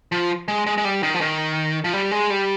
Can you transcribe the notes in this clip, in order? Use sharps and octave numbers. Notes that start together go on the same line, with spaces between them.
F3
G#3
G#3
G#3
G3
D#3
F3
D#3
F3
G3
G#3
G3